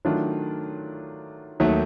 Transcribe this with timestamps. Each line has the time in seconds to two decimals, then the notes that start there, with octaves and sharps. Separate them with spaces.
0.05 D#3 F#3 A3 D4 F4
1.60 D#2 D#3 F#3 A3